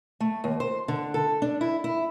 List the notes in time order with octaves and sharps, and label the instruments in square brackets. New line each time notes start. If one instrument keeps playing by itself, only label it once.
[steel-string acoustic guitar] A3
D#2
C5
D3
A4
D4
E4
E4